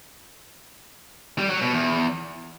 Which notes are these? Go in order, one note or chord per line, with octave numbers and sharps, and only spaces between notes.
G3
F#3
B2
E2